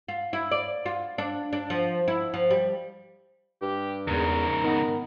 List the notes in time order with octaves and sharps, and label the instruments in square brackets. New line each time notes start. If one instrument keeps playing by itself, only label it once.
[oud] F4
E4
D5
F4
D4
D4
F3
E4
F3
G3
[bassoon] G2 [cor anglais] G4
[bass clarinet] E2 [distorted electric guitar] G#2 C#3 [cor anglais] A#4
[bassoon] D#3 [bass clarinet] B3